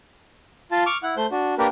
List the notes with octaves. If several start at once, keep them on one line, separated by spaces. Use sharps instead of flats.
F4 A5
C#6 D6 F6
E4 F#5
A3 C5 G6
D4 F#4
A#3 D4 G4 A#4 B4